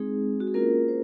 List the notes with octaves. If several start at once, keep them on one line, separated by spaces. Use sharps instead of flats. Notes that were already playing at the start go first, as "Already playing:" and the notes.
Already playing: G#3 C4 D#4 G#4
F#4
G#4
A#3 C#4 F4 A#4
C5